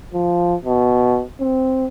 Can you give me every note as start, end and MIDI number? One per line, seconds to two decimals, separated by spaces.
0.14 0.55 53
0.65 1.23 47
1.41 1.88 60